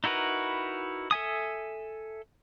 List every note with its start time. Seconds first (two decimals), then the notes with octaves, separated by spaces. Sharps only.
0.04 D#4 E4 F#4 A#4 B4
1.11 A4 E5 G#5 D#6